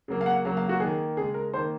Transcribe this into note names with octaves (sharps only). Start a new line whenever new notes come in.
C#3 F#3 A#3
F5
F#5
C#3 F#3 A#3 F5
F5
F#4
D#3 A#3 G#4
C#3 G#3 G#4
A#4
D#3 A#3 C5